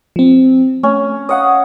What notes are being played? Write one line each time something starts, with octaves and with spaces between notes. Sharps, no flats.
F3 C4
A3 C#4
C#5 D#5 F5 F#5 D#6